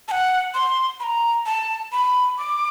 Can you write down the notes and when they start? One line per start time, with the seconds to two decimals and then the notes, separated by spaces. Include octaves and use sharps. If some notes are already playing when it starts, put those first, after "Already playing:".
0.08 A5
0.11 F#5
0.54 C6
1.00 B5
1.04 A#5
1.46 A5
1.92 B5
2.38 D6